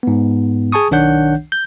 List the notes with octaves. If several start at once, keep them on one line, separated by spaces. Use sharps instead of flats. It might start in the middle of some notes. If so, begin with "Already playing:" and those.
G#2 B3
G#4 G#5 A5 C#6 D#6
B1 D#3 D4 C#5 F#5 G6
G6